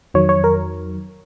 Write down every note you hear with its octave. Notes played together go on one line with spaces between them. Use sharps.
F2 D#3 F#3 C#5
C#5
A#4